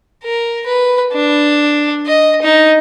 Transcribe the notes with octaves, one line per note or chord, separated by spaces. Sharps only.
A#4
B4
D4
D#5
D#4